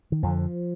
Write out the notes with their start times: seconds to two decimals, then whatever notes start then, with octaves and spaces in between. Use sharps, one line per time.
0.12 D#3
0.23 F2 D3 F3